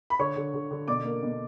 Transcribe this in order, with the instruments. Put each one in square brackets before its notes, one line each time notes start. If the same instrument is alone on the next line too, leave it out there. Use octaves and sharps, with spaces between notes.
[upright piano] B5
D3 C#5 C#6
D3
D3
D3
B2 D5 D6
A#3
B2